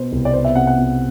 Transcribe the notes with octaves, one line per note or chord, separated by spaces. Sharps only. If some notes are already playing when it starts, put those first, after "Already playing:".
Already playing: B2 B3 C5
C2
D5
B3 C5
E5
C3 F#5
F#5
C3